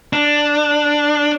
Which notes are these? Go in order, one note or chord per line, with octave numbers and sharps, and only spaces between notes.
D4